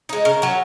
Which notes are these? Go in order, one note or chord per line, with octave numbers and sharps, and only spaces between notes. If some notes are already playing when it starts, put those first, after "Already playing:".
G#3 D#4
C#3 A#4
F#3 C#4